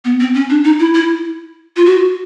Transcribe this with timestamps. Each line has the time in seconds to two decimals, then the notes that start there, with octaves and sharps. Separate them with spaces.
0.05 B3
0.20 C4
0.34 C#4
0.50 D4
0.65 D#4
0.80 E4
0.95 E4
1.77 F4
1.85 F#4